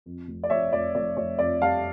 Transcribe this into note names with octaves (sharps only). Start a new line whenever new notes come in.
F2
F1
D5
F1 C#5 E5
F1 D5
F1 D5
F1 C#5
F2 D5
G3 F5 A5